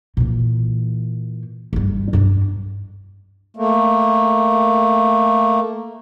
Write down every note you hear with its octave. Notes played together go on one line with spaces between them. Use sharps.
A#2 E3
F#1 G2
G2 D4
A3 A#3